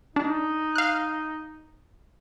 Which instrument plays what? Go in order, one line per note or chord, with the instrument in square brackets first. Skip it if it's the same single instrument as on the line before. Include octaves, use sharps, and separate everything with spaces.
[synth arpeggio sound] D4 [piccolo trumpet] D#4
[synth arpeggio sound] F5 F#6